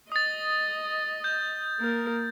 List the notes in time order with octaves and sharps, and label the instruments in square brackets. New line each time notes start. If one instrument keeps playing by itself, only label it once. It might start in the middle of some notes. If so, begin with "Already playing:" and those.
[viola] D#5 [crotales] D#6 A6
[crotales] G6
[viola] A#3 A#4